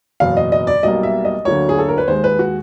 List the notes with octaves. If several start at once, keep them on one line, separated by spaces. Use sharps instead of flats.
F#1 E2 B2 F5
D#5
D#5
D5
B1 B2 G3 A#3 D#5
E5
D#5
D2 D3 F#3 A#3 C#5
G#4
A4
A#4
B4
D#2 D#3 G#3 C5
B4
F#4